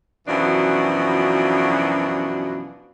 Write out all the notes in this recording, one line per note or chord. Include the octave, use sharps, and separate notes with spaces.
F#2 B2 E3 F3 D4